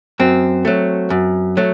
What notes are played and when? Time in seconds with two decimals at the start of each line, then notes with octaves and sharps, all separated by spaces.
0.19 F#2 C4
0.65 F#3 A3
1.10 F#2
1.57 F#3 A3